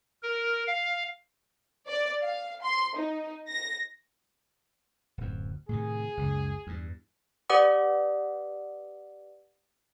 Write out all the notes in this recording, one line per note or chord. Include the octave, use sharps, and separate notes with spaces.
A#4
F5
D5
F5
C6
D#4
A#6
D1 F#2
A2 C3 D#3 G#4
F#1 C#2
E2 G2
G4 B4 D5 F#5 D6 D#6